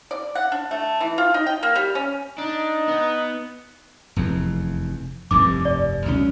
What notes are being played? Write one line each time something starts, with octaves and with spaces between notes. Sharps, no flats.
D5
F#5
D4
A3
E3
F4
D#4
G5
A#3
G3
C#4
D4 D#4
B3
F1 E2
F1 C2 G2 D6
D5
C#2 F#3 C#4